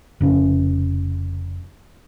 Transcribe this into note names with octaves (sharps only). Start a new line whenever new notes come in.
F1 C#3 C#4